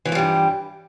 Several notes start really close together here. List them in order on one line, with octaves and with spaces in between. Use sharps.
E3 F3 A3 G3 G2